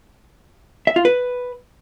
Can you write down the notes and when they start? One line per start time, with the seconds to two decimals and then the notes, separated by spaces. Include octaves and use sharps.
0.87 E5
0.96 F4
1.05 B4